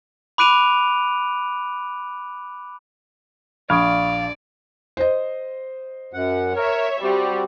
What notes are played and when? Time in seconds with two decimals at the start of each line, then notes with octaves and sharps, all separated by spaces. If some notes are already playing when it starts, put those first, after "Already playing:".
0.38 B5 D6 F#6 D7 D#7 F7
3.70 A#1 D5 F5 B5 C#6 D#6 G#6 D7
4.97 C5 D#5
6.13 F#2 F#5
6.56 A#4 C#5 E5
7.02 G3 C4 F#4 G4